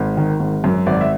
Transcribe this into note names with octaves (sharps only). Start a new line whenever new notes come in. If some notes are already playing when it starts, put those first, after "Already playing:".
Already playing: G#1
D#3
G#1
F#2
G#1 D5
E5